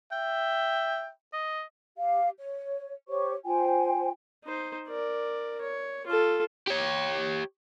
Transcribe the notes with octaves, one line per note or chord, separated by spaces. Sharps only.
E5 G5
D#5
G4 F5
C#5
G4 C5 C#5 C#6
F4 C5 G5 G#5
D#4 C5
A#4 D5
C#5
F4 A4
G4 C#5